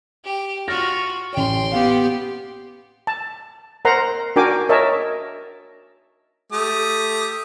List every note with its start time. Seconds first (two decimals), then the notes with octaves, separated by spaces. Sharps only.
0.25 G4
0.68 F4 F#4 F6 A6 A#6
1.33 A1 C#5 G5 C6
1.72 B3 G4 F5
3.07 A5
3.85 A#4 C5 F#5 A#5 C6
4.36 D4 F#4 A#4 G5 G#5 D6
4.69 A#4 C#5 D#5 E5 A5
6.52 A3 G4 D#6